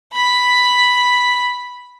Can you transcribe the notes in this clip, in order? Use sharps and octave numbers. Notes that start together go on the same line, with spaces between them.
B5 B6